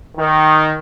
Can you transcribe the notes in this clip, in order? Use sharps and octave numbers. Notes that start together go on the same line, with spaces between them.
D#3